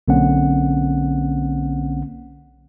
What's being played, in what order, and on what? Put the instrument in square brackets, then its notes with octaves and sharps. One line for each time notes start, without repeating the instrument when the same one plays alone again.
[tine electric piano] B1 D3 A#3 C4 C#4 F#5